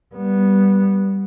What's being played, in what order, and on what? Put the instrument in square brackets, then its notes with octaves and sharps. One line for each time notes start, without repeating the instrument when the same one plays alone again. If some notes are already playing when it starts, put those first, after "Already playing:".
[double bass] G3 B3